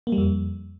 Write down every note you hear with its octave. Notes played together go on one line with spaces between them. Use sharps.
A#3
G3
F2